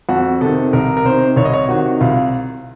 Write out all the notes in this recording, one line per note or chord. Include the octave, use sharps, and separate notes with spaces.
F2 F#4
C3 D#3 A4
C2 A#4
A#4
C3 D#3 C5
C2 C#5
D#5
C#5
C3 D#3 F#4
C2 F4